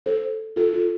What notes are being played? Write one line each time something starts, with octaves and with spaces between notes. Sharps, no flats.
A4 C5
F4 A4
F4 A4